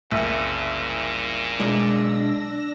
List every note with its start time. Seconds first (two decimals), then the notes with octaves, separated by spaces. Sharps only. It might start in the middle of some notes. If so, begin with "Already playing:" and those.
0.11 F#1 C2 A#2
1.60 B1 G#3 D4 D5 E6 A#6